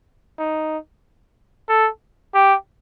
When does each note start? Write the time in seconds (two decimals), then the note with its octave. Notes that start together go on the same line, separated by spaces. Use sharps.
0.39 D#4
1.69 A4
2.34 G4